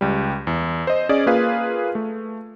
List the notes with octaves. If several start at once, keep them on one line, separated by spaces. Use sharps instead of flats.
C#2 G3
E2
C5 D#5
C#4 G#4 D5 D#5
A#3 F4 G#4 B4 F5
A3